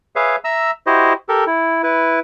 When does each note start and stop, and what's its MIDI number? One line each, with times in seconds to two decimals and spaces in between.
0.16 0.36 68
0.16 0.36 71
0.16 0.36 73
0.16 0.36 76
0.16 0.36 77
0.44 0.71 76
0.44 0.71 82
0.44 0.71 88
0.87 1.13 64
0.87 1.13 66
0.87 1.13 67
0.87 1.13 72
0.87 1.13 75
1.29 1.44 67
1.29 1.44 69
1.29 1.44 70
1.47 1.83 64
1.83 2.20 64
1.83 2.20 71